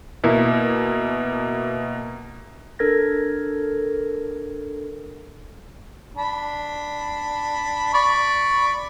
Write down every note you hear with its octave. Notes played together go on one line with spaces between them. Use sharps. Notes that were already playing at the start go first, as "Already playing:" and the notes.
B2 A#3 E4
D4 A4 A#4 G#6 A#6
D4 B5
D5 B5 C#6